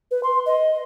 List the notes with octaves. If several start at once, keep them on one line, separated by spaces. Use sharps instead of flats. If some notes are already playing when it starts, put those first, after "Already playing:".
B4
C6
D#5